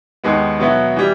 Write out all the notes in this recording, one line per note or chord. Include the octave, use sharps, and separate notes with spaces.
D#2 D#3 G#3 B3
B2 F#3 B3 E4
E3 G3